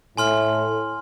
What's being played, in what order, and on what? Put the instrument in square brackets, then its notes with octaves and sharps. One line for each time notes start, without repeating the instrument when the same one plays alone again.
[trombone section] A2 [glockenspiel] G#5 C6 F6